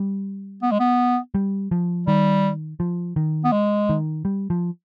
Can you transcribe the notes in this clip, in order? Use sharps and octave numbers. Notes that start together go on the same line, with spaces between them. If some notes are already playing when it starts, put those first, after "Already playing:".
Already playing: G3
B3
G#3
B3
G3
F3
D#3 G3
F3
D#3
B3
G#3
D#3
G3
F3